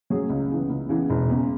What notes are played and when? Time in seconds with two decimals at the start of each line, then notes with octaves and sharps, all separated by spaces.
0.10 F#3 C#4 G#4
0.30 C#2
0.50 C#3 E3 B3
0.70 C#2
0.89 C#3 E3 B3
1.10 E1
1.30 E2 C#3